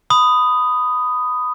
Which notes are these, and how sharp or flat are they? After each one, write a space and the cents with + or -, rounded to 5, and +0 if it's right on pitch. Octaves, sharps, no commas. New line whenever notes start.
B5 +15 D#6 +0